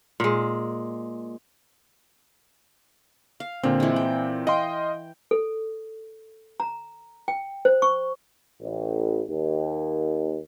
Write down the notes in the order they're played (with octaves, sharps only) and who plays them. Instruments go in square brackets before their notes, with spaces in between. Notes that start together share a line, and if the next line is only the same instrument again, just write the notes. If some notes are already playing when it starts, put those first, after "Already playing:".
[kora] A#2 G#3
[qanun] F5
[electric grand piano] A#2 C4 [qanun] D3
[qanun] E3 G#3
G5
[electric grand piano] D#5 F5 C6 [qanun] G5
[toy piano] A4
A#5
G5
C5
C#6
[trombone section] A1
D#2